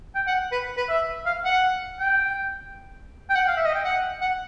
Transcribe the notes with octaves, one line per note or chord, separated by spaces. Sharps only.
G5
F#5
B4
B4
E5
F5
F#5
G5
G5
F#5
F5
E5
D#5
G5
F#5
F#5